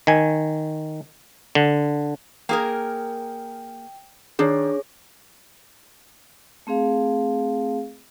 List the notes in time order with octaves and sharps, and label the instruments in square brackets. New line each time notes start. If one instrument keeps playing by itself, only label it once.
[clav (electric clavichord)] D#3 G#5
D3
[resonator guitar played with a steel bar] A#3 G#4 A#4 [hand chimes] G5
[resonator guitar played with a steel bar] D#3 [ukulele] D4 [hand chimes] G#4 C#5
[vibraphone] A3 C4 G#4 F5